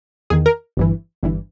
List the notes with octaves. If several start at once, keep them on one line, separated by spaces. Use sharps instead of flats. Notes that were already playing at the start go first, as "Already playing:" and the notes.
E2 D#3 G#4
A#4
G1 G2 E3
G1 G2 E3